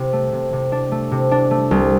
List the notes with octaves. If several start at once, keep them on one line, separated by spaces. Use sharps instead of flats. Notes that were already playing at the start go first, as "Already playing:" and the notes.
Already playing: C3
A3
C3
C3
D4
A3
C3
D4
A3
C2